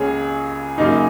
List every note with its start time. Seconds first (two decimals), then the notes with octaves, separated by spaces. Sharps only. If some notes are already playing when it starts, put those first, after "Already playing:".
Already playing: C#2 C#3 A#3 G#4 C#5
0.78 F#2 C#3 A#3 D#4